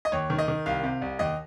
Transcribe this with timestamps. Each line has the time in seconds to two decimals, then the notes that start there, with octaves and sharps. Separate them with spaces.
0.05 D#5
0.12 D#2 C#5
0.30 D#3
0.39 D#5
0.48 D#3
0.66 C2 F5
0.83 C3
1.02 C2
1.19 D#2 D#5